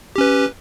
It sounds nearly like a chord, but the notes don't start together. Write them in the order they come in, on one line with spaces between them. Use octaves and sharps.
G4 C#4 B4